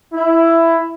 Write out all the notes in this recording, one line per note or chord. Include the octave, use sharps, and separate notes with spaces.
E4